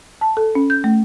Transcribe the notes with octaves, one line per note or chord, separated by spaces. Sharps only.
A5
A4
C#4
G6
A3